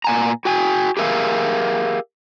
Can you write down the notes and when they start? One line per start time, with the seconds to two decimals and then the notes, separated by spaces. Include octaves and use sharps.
0.04 A#2 G#5 A#5
0.45 F#4 G5 G#5
0.97 G4 G#4 A#4 E5 F5